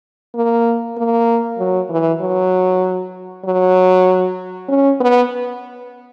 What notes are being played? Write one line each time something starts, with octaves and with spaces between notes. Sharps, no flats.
A#3
A#3
F#3
E3
F#3
F#3
C#4
B3